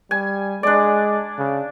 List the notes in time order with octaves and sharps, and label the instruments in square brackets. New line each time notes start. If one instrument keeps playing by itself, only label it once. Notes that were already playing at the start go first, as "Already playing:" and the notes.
[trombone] G3 [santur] G#5
[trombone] G#3 [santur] D4 D5
[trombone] C#3